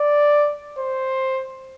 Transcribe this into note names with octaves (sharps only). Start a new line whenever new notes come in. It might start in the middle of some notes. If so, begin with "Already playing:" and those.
Already playing: D5
C5